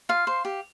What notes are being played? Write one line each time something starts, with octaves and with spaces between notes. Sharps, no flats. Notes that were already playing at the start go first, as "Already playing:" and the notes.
F4 F5
C5
G4